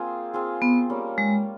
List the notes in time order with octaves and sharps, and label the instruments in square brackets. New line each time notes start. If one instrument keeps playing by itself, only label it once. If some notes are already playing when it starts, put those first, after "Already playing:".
Already playing: [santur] A#3 C4 F4 G#4
C4 F4 G#4
[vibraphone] B3
[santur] G3 A#3 C#4
[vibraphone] G#3